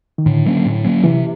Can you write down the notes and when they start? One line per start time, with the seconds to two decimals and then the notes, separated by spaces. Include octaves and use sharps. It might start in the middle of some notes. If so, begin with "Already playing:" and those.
0.18 D#3
0.26 A2 D3
0.46 F#3 A#3 C#4
0.66 A2
0.84 F#3 A#3 C#4
1.04 C3 E3